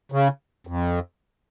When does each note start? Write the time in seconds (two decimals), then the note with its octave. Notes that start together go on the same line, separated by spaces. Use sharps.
0.12 C#3
0.67 F2